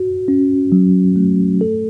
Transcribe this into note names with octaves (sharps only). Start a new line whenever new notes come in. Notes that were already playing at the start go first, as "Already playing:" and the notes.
Already playing: F#4
C#4
F#3
A3
A4